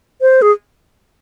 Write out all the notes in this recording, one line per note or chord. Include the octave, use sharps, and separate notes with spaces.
C5
G#4